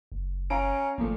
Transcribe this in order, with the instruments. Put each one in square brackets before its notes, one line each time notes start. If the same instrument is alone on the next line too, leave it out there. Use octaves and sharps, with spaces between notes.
[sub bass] F#1
[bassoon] C#4 [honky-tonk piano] F5 A#5 D7
[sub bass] G#1 [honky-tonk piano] A#2 F3 A3